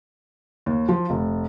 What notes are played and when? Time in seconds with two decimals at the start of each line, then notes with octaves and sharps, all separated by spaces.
0.66 D#2
0.89 F3
1.10 F1